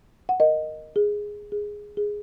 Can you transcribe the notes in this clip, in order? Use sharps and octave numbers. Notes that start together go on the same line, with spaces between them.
F#5
A#4 D#5
G#4
G#4
G#4